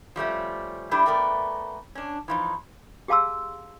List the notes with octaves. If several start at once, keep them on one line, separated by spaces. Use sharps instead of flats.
F3 G3 A3 C#4
G3 A3 D4 E4 G4
A3 B3 A#4 D5 G5
C#4 D4
E3 F3 D#4
G4 G#4 F5 A5 C6 E6